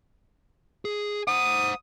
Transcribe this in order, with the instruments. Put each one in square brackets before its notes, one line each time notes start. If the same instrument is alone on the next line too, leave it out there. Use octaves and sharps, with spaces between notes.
[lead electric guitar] G#4
[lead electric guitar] C5 F#5 [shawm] D#6